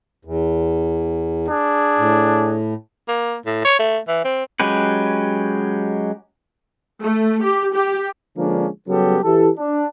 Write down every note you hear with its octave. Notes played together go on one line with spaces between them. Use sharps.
E2
D4 G#4
A2
A#3
A2
C#5
A3
E3
C4
F#3 G#3 C#4 G4 B4
A3
G4
G4
D3 F3 G#3 A#3 C#4 D4
C#3 F#3 G3 B3 G4 A4
E3 E4 G4 A4
D4